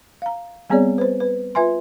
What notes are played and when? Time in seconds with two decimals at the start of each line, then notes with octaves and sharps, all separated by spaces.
0.22 F5 A#5
0.70 G3 B3 C4 G#4 C#5 D5
0.98 B4 C5
1.20 B4
1.55 F4 B4 E5 G#5 C6